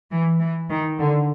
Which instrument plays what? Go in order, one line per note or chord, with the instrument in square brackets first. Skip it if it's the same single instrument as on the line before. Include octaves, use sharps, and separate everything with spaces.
[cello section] E3
E3
D#3
D3